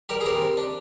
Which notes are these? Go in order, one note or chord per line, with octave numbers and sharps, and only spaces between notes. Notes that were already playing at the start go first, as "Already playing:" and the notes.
G3 G4 A#4
G#4
C3 G4 A#4
C3
D4